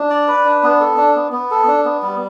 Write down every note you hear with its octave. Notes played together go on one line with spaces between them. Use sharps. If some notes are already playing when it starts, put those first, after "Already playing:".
Already playing: D4
D5
B4
D4
B3
A4
D4
B3
B3
A4
D4
B3
G3